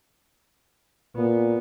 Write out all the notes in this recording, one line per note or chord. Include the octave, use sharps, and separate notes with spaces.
A#2 B3